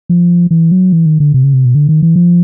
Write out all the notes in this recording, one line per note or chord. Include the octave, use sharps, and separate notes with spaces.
F3
E3
F#3
E3
D#3
D3
C3
C#3
C3
B2
D3
D#3
E3
F3